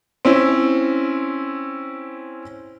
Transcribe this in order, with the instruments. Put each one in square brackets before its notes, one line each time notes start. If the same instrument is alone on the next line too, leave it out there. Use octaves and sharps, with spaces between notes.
[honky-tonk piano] C4 C#4 E4